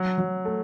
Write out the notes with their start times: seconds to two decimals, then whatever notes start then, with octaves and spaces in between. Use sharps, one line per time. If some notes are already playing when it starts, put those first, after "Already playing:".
Already playing: F#3
0.18 F#3
0.45 A3